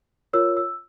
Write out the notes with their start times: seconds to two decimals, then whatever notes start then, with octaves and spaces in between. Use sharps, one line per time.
0.33 F4 A#4 C#5 E6
0.57 E6